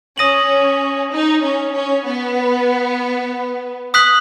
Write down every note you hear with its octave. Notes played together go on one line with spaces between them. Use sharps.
C#4 D#6 A#6 D#7 F#7
D#4
C#4
C#4
B3
D#6 F#6 B6 F#7